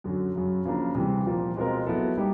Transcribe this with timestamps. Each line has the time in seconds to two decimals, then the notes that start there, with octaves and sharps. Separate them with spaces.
0.04 F#2 D3 F#3
0.35 F#2 C#3 F#3
0.65 C#3 F3 A#3 D4
0.95 C3 E3 G3
1.26 A#2 F3 A#3
1.56 B2 G#3 C4 F4 A#4
1.87 F#3 B3 E4 A4
2.17 G3 A#3 D#4 G4